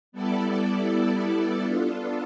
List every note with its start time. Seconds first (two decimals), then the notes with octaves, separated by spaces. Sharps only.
0.12 G3 B3 E4 A4 D5
1.61 B3 D4 F4 A4